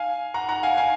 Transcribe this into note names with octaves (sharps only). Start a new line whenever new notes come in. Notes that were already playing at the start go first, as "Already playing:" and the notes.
Already playing: F5 G#5
F#5 A#5
F#5 A#5
F5 G#5
F5 G#5